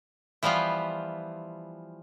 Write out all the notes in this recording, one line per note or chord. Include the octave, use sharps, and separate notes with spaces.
E3 F3 G3 B3 F4